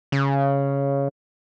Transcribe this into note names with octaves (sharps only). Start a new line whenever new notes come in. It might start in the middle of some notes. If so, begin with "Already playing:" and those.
C#3